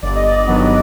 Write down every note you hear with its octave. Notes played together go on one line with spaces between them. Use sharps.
G1 D5
D#5
D5
G2 D#3 F#3 B3